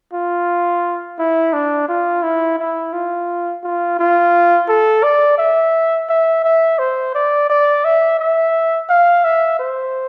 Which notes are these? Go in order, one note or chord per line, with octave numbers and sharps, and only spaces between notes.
F4
E4
D4
F4
E4
E4
F4
F4
F4
A4
D5
E5
E5
E5
C5
D5
D5
E5
E5
F5
E5
C5